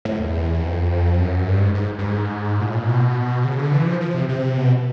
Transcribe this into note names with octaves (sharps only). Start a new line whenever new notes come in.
A2
E2
F2
F#2
G2
G#2
G#2
G2
G#2
A#2
A2
A#2
B2
C#3
D3
E3
F3
F3
C3
C3
B2